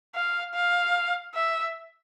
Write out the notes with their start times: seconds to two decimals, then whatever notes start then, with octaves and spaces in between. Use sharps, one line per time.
0.15 F5
0.54 F5
1.35 E5